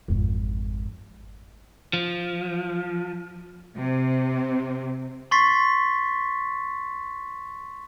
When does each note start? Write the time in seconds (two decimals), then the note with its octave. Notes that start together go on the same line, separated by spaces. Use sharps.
0.08 G#1 F2
1.93 F3
3.77 C3
5.31 C6 C#6 A6 B6 C7